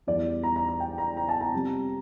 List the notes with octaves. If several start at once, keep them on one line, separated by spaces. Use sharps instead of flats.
E2 E3 G3 D5
A#5
A#5
A#5
G5
A#5
A#5
A5
A#5
F2 C3 G3